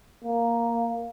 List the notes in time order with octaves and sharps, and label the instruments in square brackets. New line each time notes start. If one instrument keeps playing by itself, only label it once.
[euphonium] A#3